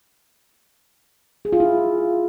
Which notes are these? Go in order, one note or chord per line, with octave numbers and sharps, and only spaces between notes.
G#4
F4
E4